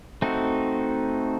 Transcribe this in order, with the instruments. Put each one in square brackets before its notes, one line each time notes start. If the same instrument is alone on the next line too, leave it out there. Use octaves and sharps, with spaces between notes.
[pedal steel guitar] A3 C4 D#4 F#4